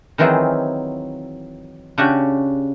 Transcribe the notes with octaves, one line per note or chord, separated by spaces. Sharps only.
D#3 E3 F#3 C4 F4 G#4
C#3 D4 F#4 G4